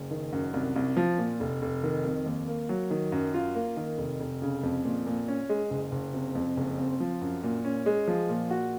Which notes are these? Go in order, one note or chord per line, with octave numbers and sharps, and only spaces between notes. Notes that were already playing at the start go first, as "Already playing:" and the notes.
Already playing: F#1
D#3
F#2
C2
C2
F3
A#2
F1
F1
D#3
F2
D#2
A#3
F#3
D#3
F#2
F4
A#3
D#3
F1
F1
C#3
F2
A#2
A#2
C#4
G#3
F#1
F#1
C3
F2
F#1
C4
F3
F#2
A#2
C#4
G#3
F3
A#2
F#4